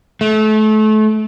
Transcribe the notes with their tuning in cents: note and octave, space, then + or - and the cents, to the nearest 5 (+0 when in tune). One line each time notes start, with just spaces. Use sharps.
A3 -30